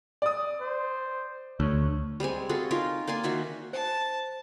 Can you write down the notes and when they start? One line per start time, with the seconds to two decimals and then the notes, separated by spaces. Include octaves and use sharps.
0.22 D5 D#6
0.60 C5
1.60 D2 C#5
2.20 G3 G#3 C4 G#5
2.49 F4 F#4 G#4 A4
2.71 D#4 F4 A#4
3.07 A#3 D5 G#5 C6
3.23 D#3 F#4 E5 F#5
3.73 C5 A5